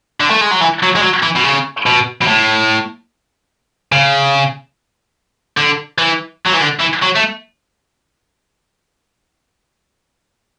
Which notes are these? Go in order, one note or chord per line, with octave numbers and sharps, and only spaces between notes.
D3
A3
G#3
F#3
E3
F#3
G#3
F#3
E3
B2
C#3
B2
B2
A2
C#3
D3
E3
F#3
E3
D3
E3
F#3
A3